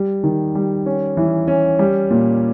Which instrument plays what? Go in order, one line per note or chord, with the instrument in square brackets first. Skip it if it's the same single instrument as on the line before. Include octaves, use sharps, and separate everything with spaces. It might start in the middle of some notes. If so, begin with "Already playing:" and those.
Already playing: [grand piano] G3
D#3
G3
C#4
E3
C#4
G3
A#2